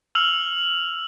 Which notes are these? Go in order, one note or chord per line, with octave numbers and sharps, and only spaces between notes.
E6 F6 F7 F#7